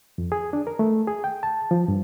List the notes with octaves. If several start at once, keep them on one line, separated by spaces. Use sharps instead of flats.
F2
G#4
D4
A#4
A3
G#4
G5
A5
F3
G2